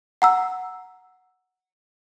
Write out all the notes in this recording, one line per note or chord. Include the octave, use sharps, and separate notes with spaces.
F#5 A#5 E6